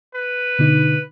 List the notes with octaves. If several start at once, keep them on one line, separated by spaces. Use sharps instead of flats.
B4
B2 D3 D#4